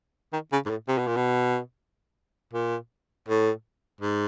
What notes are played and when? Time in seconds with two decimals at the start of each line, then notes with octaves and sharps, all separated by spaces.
0.33 D#3
0.52 C#3
0.66 G#2
0.70 A2
0.88 C3
0.98 B2
1.07 A#2
1.16 B2
2.53 A#2
3.28 A2
4.01 G#2